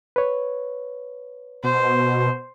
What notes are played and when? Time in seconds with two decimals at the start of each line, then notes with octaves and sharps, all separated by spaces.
0.16 B4 C#5
1.64 B2 C5